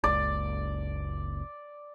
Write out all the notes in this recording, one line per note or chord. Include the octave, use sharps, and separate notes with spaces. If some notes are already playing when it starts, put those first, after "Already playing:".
F#1 C#2 D5